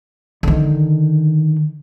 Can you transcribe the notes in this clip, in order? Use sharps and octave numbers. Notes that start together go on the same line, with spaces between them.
D3 D#3